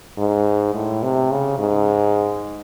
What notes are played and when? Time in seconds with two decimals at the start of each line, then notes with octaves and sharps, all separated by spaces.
0.18 G#2
0.75 A2
1.03 C3
1.31 C#3
1.59 G#2